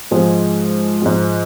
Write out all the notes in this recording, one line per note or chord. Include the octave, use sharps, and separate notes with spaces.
G#2 F3 G#3
G#2 F3 G#3